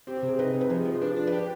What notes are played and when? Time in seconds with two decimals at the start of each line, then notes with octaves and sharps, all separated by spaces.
0.07 C4 G4
0.17 G4
0.23 C3
0.28 G#4
0.39 D#4 B4
0.54 C3
0.61 B4
0.70 F3 G#4
0.86 F3 G#4
1.02 D4 B4
1.14 D4 G#4
1.27 G4 B4